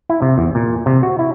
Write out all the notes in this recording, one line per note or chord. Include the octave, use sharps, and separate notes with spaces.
E4
C3
E2
A#2
C3
F#4
E4